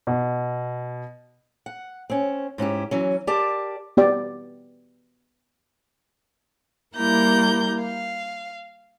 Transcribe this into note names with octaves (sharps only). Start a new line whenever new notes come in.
B2
F#5
C4 C#4
G#2 C#4 E4 G4
E3 F#3 C#4
G4 A#4 D5 A5
B3 G4 D5
G3 A#3 E4 A#4 A#5 G6
F5